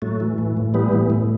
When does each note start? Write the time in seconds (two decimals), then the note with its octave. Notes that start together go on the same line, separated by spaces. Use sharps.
0.02 A2 F#3 A3
0.20 E3
0.38 A2
0.57 A2
0.74 E3 G3 B3
0.93 A2
1.10 A2